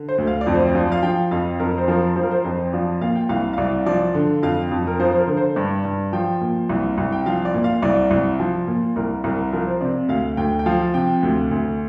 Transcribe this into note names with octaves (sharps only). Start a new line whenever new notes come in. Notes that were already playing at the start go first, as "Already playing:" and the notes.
Already playing: D3
C5
D2
F5
D5
F2
C5
D5
F3
F5
F3 G5
F2 F5
F2 A#4
C5
F3 A#4
F3 C5
A#4
C5
F2 C5
F3 D5
A#2 F5
G5
C2 F5
F5
C2 D5
F3 D5
D3
F2 F5
F2
A#4
F3 C5
C5
A#4
D3
C5
G2 D5
G2
F3 G5
A#2
C2
C2
G5
F3 F5
D5
A#2
F5
C2 D5
C2
F3
A#2
C2 A#4
C2 A#4
F3 A#4
C5
C3 D5
D2 F5
D2 G5
G5
F3 F5
C3 G5
D2
D2